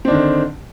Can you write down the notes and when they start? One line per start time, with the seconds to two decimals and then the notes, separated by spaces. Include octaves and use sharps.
0.05 C4
0.08 D4
0.11 D#3
0.14 D3